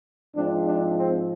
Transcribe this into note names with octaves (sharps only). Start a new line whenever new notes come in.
G#2 F3 G#3 C4 D4
D4
C4